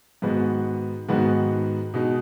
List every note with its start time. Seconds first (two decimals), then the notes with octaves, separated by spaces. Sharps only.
0.22 G#2 D#3 G#3 B3 F#4
1.09 G#2 D#3 G#3 B3 F#4
1.94 B2 G#3 D#4